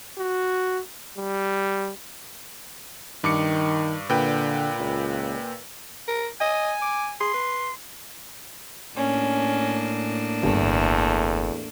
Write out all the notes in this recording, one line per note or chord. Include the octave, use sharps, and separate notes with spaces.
F#4
G3
G2 D#3 D6 C#7
A#2 D3 B4 G5
C#2
A#4
D#5 G#5
D6
G#4 C6
B4
A2 A#3 C#4 D4
G1 E2 A3